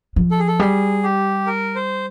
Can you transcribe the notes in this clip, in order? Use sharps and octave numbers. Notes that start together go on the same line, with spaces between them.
F3
A4
G#4
A4
G3 G#4
G4
A#4
C5